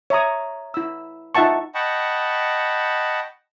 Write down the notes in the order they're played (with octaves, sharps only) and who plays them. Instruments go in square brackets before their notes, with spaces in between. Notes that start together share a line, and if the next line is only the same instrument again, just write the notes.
[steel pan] C#5 E5 A#5 D#6
E4 E6
D#4 F4 E5 F#5 A5 C#6
[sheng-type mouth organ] D#5 F#5 G5 A5 B5 C#6